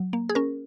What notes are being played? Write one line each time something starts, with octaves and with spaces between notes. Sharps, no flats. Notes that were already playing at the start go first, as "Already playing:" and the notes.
Already playing: F#3
A#3
G#4
C#4 A#4